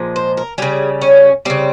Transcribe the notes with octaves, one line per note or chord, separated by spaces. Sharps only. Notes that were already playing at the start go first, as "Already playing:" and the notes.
Already playing: A#2 F3 G#3
C5
A#4
C#3 G3 G#4
C#4
C#3 G3 C4